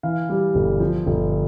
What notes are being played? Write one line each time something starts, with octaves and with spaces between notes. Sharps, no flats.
E3 F5
G3
G1
F3
G1